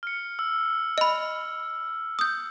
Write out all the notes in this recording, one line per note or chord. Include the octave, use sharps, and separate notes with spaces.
F6 C#7
E6
D#5 B5
D#6 G6